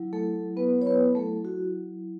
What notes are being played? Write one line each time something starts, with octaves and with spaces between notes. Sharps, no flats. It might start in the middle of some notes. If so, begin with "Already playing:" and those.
Already playing: F#3 E4
A3 A4
B3 B4
C#5
B3 B4
A3 A4
F#4